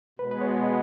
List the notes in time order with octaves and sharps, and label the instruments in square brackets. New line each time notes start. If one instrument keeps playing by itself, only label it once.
[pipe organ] B2 G#3 B3 [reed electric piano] B4
[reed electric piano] B4
C#5
D#5